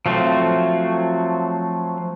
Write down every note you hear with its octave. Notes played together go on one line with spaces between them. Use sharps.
F3 F#3 A3 C4